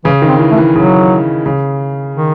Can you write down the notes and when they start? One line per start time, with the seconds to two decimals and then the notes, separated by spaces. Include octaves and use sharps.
0.04 C#3 E3
0.22 D#3
0.28 C4
0.39 E3
0.51 A3
0.57 E3
0.75 C#3 F#3
1.46 C#3
2.15 D#3